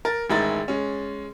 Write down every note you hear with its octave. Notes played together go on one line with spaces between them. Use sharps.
A#4 A6
A1 D#3 G#3 E4 A#5 A6
G#3 C#4